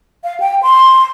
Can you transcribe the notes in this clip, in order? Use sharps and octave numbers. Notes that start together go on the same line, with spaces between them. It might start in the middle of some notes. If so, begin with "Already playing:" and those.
F5
G5
C6